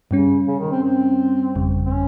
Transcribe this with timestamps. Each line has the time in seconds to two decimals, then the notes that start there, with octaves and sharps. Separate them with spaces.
0.11 G2 C#3 G3 C#4
0.47 C#3
0.59 D#3
0.72 C4
0.83 C4
1.55 G1 F2 C#3 G3
1.86 C4
1.92 C#4